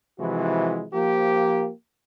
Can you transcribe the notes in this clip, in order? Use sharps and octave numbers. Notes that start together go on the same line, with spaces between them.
C3 E3 F3 G#3 E4 F#4
F3 A#3 G4